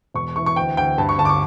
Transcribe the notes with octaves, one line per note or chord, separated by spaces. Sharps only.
E1 C#6
E3 C#6
C#6
D2 G5
D2 G5
G2 A5
C#6
G1 A5
D6
C#6